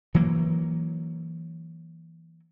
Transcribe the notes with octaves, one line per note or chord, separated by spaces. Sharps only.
E3 F#3 A#3